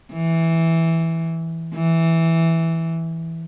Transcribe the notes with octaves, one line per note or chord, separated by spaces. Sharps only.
E3
E3